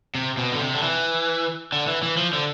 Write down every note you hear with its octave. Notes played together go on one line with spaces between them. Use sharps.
C3
B2
D3
C3
D3
E3
D3
E3
E3
F3
D3